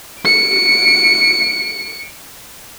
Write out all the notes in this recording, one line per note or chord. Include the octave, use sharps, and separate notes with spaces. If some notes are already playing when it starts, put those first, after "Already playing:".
C#7 D7